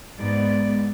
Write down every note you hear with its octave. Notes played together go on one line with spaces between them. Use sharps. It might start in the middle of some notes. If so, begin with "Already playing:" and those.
G#2 G#3 B3 D5